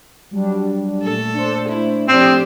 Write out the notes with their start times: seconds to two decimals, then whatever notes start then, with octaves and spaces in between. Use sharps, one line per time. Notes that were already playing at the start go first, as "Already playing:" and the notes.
0.31 F#3 G3 D4
1.03 A#2 A3 A4
1.34 D4 C5
1.68 A3 E4
2.08 A2 F3 C4 D4 G4 C5 D#6